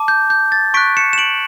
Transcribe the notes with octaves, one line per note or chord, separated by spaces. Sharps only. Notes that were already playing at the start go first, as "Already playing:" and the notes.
Already playing: A5 D6
G6
G6
A6
C#6 F#6 B6 D7
C#7 E7
E7
D7 F#7